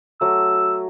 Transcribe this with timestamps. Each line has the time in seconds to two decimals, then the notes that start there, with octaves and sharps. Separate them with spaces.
0.21 F#3 A3 E6